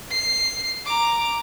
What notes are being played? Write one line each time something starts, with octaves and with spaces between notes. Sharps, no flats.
C7
A#5 D6